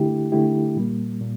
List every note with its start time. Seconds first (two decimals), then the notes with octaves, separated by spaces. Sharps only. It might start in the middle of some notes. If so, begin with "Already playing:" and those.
Already playing: D3 A3 E4 G4
0.32 D3 A3 E4 G4
0.76 A#2 G3 A#3
1.21 A#2